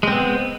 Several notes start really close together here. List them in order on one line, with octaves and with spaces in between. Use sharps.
G#3 C4 B3